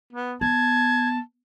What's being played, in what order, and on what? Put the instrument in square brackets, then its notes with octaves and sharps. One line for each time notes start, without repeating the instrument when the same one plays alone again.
[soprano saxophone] B3
[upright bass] B3 [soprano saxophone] A5 [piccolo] G#6